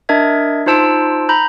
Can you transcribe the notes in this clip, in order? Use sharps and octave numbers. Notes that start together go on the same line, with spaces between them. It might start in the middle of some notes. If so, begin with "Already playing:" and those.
D4 A#4 D#5 E5 G#6
D#4 F4 C5 A5 E6 D7
A#5 B5 G6